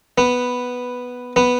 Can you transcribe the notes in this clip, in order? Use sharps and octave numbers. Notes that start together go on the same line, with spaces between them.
B3
B3